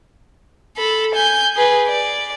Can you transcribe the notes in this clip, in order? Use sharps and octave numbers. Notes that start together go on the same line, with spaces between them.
A4 B5
G#5 G6
G#4 B4
D5